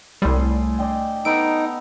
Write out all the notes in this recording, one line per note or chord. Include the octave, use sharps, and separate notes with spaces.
C2 A2 G3 G#4 C6
D5 D#5 G5
B3 D#4 A4 D#5 D7